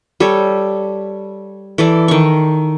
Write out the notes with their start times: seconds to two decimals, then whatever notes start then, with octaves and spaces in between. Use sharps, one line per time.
0.20 G3 A4 C#5
1.78 E3 A4 D5
2.08 D#3 C#6